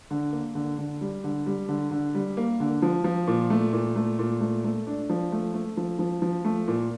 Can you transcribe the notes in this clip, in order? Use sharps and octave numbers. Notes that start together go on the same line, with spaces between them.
D3
A#3
D3
D3
G3
D3
G3
D3
D3
G3
A#3
D3
F3
F3
A#2
A3
A#2
A3
A#2
A3
A3
D4
F3
A3
A3
F3
F3
F3
A3
A#2